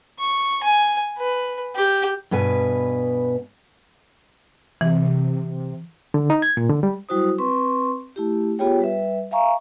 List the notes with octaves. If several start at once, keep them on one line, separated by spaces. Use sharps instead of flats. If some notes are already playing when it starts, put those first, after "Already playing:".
C#6
G#5
B4
G4
G2 B2 B4 G#5
C3 E3
D3
D#4
G#6
A#2
D3
G3
F#3 G3 E4 F#4 C5 D#6
C4 B4 C6 C#6
A3 E4 G4
B3 F4 G4 G#4 C#5 G5
G3 B4 E5
E5 F5 G#5 A#5 C#6